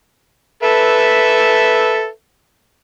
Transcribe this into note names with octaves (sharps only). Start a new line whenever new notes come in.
A4 B4 E5